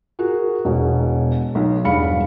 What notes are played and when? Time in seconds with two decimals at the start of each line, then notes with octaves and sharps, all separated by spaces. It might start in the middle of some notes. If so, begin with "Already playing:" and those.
0.19 F#4 G#4 A#4
0.65 E1 B2
1.55 B1
1.85 E1 G2 F5 B5 C#7